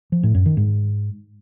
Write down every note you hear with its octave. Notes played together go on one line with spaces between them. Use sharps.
F3
A2
F#2
D#3
G#2